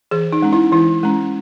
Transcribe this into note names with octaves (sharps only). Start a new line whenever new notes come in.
E3 G#4
D#4
G#3 C#4
E4
E3 E4
G#3 C#4